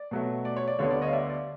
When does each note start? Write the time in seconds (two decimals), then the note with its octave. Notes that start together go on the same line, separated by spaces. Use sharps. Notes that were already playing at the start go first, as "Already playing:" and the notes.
Already playing: D5
0.11 B2 F#3 A3
0.45 D5
0.56 C#5
0.68 D5
0.79 D2 D3 G3 B3 C#5
0.91 D5
1.01 C#5 D#5
1.08 F5
1.13 D5 E5
1.30 D5